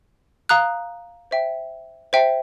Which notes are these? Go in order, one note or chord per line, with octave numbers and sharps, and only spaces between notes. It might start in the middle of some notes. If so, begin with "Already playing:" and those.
F5 A#5 D#6 F#6
C5 E5 G5
C5 E5 G5